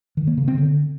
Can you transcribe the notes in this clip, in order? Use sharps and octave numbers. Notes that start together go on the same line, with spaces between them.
D#3
A#3
C#3
C4
D3